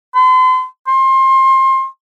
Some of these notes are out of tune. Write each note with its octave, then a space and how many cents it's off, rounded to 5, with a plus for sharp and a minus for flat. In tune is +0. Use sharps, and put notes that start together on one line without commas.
C6 -40
C6 +25